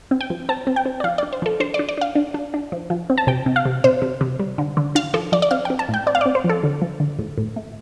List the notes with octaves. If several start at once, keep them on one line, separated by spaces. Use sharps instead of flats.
C4
G5
F3
C4 A5
C4
G5
C4
D5
F3 F5
D4 D5
C5
F3 A4
D4 C5
D5
D4
D5
D4 F5
D4
D4
D4
F3
F3
C4
A5
C3 G5
C3
F5
C3
C3 C5
C3
C3
G3
D3
D3
D4 F5
F3 A4
F3 D5
D5
C4 F5
C4 G5
A5
A2 G5
C4 D5
F5
C4 D5
C5
F3
A4
D3
F3
D3
A2
A2
A3